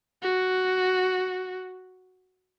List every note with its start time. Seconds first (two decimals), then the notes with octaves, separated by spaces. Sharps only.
0.22 F#4